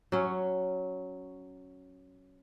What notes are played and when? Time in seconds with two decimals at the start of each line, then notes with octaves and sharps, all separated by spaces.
0.12 F#3 C#4